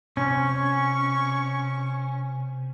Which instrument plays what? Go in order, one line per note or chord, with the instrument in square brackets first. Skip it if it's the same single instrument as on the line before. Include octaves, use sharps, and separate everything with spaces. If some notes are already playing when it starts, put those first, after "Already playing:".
[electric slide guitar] C3 [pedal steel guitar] C#4 [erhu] C#6